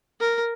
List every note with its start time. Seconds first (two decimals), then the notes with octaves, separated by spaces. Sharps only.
0.20 A#4